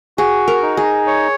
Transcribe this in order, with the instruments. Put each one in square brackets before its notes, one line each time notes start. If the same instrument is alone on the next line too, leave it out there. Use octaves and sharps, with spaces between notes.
[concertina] F#4 [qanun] G#4
[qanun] A#4
[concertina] D#4
[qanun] G#4
[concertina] C#5